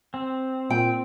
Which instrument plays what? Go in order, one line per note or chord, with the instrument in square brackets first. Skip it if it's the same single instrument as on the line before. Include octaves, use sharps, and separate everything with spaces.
[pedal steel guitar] C4
[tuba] A#2 [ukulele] G5